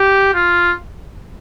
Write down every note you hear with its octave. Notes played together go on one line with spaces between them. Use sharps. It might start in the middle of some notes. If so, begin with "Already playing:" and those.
Already playing: G4
F4